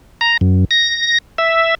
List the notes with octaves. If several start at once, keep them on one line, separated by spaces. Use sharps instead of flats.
A#5
F#2
A#6
E5